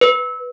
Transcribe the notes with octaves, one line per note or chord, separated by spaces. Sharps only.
B4